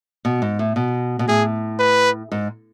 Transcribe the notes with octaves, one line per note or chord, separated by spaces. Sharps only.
B2
G#2
A2
B2
B2
A2 G#4
B4
G#2